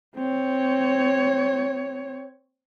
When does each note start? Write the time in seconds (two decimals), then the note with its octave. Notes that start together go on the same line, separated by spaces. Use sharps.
0.16 C4 C#5